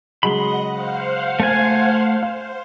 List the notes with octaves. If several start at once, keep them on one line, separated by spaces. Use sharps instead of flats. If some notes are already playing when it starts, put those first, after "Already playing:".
C#3 F#3 G#3 D#5 F#5 B5 C6
C5 F5 F#5
A3 G#5
C5 F5